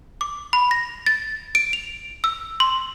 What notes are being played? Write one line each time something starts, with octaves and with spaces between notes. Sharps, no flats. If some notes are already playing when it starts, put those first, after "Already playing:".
D6
B5
A#6
A6
D7
F7
E6
C6